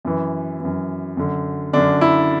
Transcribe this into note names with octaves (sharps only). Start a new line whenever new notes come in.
F#2 E3
F#2 E3
F#2 D3
F#2 D3 D4
E4